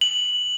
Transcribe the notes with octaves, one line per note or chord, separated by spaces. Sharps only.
F#7